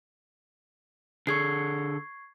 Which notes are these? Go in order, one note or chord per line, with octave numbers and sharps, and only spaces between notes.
D3 G#4 A4 C#6 G#6 C7